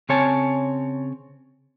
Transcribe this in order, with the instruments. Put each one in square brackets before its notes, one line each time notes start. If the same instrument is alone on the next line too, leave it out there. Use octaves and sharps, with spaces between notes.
[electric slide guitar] C#3 C4 C#5 G#5 A5